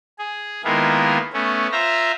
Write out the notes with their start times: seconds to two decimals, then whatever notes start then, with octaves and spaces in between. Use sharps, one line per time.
0.19 G#4
0.64 D#3 G#3 A#3 B3 E4 F4
1.33 A3 B3 C#4
1.72 F4 C5 E5 A#5